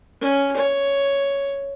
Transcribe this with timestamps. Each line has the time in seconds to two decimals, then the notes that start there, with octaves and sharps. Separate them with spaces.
0.21 C#4
0.57 C#5